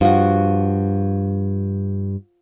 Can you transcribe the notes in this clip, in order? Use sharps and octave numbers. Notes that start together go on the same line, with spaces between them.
G2 F3 F#4